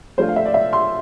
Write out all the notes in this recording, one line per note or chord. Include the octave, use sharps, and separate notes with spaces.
F3 A3 D4 F4 C5
F5
E5
D5
E5
C6